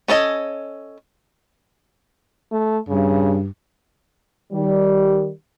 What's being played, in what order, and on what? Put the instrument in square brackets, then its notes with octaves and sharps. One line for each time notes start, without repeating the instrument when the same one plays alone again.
[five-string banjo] C#4 D4 A4 D#5 G#5
[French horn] A3
[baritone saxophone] G2 [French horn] C#3
[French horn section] D#3 G3